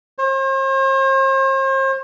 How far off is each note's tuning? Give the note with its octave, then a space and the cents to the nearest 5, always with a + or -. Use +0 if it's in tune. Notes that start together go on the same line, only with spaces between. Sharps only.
C5 +45